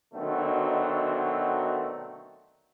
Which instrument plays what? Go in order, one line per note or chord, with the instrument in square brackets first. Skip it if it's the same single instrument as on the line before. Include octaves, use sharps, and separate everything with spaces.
[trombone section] B2 D3 D#3 F#3 A3 C4